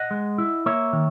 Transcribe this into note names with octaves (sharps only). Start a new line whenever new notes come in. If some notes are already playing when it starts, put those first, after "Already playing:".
Already playing: D#5 F#5
G#3
E4
A#3 C#5 E5
D#3